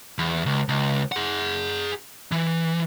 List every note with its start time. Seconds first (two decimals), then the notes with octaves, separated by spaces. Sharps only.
0.19 E2
0.46 C#2
0.69 C#2
1.12 G#4 F#5
2.32 E3